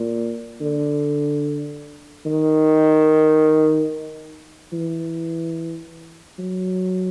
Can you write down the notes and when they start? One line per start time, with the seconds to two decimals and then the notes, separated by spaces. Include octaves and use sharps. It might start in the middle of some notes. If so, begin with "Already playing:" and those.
Already playing: A#2
0.61 D3
2.26 D#3
4.73 E3
6.39 F#3